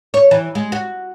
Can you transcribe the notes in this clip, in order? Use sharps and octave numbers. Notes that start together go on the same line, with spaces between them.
C#5
E3
G#3
F#4